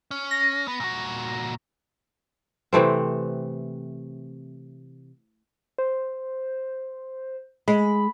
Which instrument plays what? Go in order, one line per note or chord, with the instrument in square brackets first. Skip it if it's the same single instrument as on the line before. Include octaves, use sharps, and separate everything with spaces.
[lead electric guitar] C#4
[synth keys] A#6
[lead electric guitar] B3
A#2 F#4
[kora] C3 E3 A3 C4
[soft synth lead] C5
[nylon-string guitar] G#3 [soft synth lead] B5